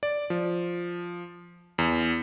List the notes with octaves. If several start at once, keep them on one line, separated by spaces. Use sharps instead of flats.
D5
F3
E2